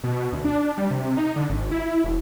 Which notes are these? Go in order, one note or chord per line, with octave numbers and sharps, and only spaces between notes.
B2
D2
D4
G3
C3
D#4
D3
G#1
E4
E1